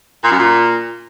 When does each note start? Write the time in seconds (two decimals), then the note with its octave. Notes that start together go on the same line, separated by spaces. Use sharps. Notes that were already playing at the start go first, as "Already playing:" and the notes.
0.23 A#2
0.31 F#2
0.38 A#2